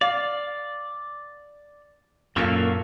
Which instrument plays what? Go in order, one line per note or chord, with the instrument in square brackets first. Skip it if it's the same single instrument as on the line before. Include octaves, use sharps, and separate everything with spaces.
[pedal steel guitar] D5 [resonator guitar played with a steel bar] F5
[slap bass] F#2 A#2 [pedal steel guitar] A#3 C#6 E6 [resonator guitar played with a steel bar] F4 A4 F5